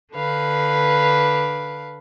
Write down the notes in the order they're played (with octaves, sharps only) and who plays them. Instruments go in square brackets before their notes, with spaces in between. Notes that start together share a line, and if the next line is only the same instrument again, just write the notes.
[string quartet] D3 B4 F5